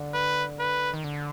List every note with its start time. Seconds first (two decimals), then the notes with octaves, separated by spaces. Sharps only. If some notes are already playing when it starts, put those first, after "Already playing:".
Already playing: D3
0.14 B4
0.59 B4
0.94 D#3
1.04 D3